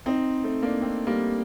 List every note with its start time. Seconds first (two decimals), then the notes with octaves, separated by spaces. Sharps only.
0.06 C4 D#4
0.44 A3 C4
0.62 A#3 D4
0.81 A3 C4
1.07 G3 A#3